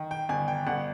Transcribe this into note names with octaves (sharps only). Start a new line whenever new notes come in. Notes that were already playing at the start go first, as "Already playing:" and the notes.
Already playing: D#3
G5
G1 G#5
G5
G1 F#5